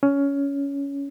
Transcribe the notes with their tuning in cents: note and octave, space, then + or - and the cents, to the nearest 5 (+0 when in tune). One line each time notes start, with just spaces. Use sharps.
C#4 +15